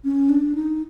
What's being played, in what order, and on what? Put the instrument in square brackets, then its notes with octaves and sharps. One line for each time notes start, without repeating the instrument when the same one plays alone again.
[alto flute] C#4
D4
D#4